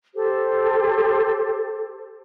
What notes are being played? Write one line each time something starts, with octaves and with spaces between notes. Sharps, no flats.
G4 A4 C5